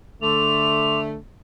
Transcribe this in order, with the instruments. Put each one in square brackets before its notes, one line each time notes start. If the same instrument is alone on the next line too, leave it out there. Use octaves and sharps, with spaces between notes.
[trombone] D3 [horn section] A3 [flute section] C6 D6 [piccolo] F7